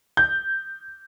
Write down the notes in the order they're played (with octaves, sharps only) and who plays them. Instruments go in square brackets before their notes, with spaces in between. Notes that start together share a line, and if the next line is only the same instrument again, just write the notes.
[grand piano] G6